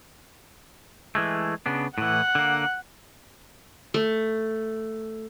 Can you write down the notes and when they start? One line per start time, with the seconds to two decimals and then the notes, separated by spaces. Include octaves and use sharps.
1.15 E3 G#3 A3
1.66 C#3 B3 D4
1.98 A2 E3 F#5
2.35 D3 A#3
3.94 A3